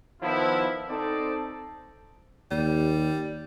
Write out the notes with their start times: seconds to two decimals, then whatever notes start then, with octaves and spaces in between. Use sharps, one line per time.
0.22 D#3 F3 B3 E4
0.89 C4 D#4 A4 C5 D5
2.51 D#2 G3